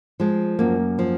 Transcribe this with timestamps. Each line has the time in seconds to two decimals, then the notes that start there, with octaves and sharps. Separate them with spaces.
0.20 F3 G#3
0.59 F#2 A#3
0.99 F3